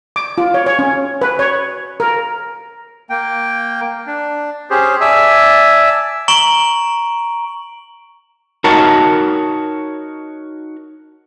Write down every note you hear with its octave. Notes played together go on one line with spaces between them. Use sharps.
D6
F4
C#5
C#5
C#4
B4
C#5
A#4
A#3 G5
D4
C#4 G4 G#4 C5
D5 E5 G#5 A5 E6
A#5 C#6 D7 F#7
D#4 F#4 A#4 C#5 A5